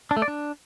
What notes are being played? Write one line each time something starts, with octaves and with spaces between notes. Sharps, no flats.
D4
A3
D5
D4